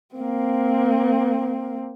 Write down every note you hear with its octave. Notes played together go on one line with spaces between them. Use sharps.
A#3 C4